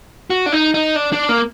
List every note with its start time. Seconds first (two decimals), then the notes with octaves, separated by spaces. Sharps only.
0.30 F#4
0.46 D4
0.52 D#4
0.74 D#4
0.96 D4
1.13 D4
1.29 A#3